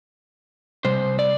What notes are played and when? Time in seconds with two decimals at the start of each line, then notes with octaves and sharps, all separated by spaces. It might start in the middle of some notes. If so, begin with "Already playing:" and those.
0.85 C3 G3 C5
1.19 D5